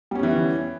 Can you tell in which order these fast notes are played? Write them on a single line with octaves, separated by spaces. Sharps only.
G3 C#4 B3 E3